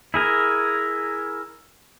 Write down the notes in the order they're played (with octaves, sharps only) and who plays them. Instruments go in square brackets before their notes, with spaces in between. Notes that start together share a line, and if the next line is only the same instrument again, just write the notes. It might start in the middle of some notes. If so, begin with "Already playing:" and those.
[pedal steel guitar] E4 G#4 A#4